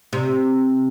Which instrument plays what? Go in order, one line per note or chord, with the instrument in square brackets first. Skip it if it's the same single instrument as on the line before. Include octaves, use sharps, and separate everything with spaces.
[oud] C3